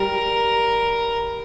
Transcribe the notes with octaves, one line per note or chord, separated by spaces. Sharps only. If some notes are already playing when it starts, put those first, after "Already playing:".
Already playing: G3 A#4